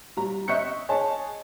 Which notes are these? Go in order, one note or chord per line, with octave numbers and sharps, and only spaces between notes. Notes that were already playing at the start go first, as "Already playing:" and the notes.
G3 A#5
D#5 E5 C#6 F#6 G6 C#7
G#4 C#5 D#5 G#5 A5